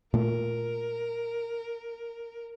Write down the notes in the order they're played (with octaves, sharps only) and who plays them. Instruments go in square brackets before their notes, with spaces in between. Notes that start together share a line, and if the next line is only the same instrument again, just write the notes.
[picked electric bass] A#2 A3 [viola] A#4